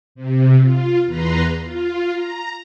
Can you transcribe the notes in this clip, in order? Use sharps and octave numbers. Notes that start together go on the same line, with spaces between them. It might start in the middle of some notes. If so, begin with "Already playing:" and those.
C3
F4
E2 B4 A#5 C6
F4
A#5